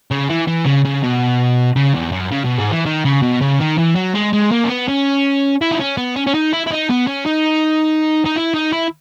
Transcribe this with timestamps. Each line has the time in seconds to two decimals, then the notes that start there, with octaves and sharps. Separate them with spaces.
0.11 C#3
0.29 E3
0.48 E3
0.66 C#3
0.85 C#3
1.03 B2
1.76 C#3
1.94 E2
2.12 F#2
2.31 C#3
2.44 B2
2.58 G#2
2.72 E3
2.86 D#3
3.05 C#3
3.22 B2
3.41 C#3
3.60 D#3
3.78 E3
3.95 F#3
4.14 G#3
4.33 G#3
4.51 A#3
4.64 C#4
4.69 B3
4.88 C#4
5.61 E4
5.71 D#4
5.80 C#4
5.97 B3
6.16 C#4
6.26 C#4
6.34 D#4
6.53 E4
6.66 E4
6.71 D#4
6.90 B3
7.07 C#4
7.25 D#4
8.25 D#4
8.36 E4
8.54 D#4
8.73 E4